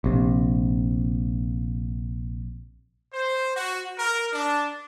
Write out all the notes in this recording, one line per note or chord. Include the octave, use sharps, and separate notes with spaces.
A#1 C3
C5
F#4
A#4
D4